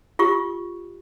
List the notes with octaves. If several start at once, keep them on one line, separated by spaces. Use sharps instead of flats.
F4 G4 C#6